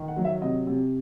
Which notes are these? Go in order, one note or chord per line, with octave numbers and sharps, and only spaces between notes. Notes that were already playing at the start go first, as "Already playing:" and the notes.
Already playing: D#3
F#5
F#3
E5
C3 D#5
C3